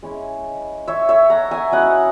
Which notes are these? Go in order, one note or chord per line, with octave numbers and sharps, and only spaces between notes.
G#3 C#4 E4
C#5 E5
C#5 E5
F#5 A#5
E5 G#5
F#3 C#4 E4 D#5 F#5